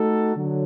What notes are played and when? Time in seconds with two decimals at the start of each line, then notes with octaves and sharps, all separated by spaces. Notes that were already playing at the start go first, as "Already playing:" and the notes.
Already playing: A3 D#4 F#4 A4
0.36 D3 F#3